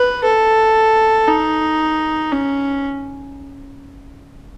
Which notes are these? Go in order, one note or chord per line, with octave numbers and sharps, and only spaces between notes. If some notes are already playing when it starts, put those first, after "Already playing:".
Already playing: B4
A4
D#4
C#4